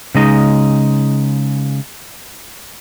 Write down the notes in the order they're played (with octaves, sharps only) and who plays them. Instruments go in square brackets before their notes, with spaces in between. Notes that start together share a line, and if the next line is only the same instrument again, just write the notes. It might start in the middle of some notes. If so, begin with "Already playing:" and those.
[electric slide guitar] C#3 G#3 D#4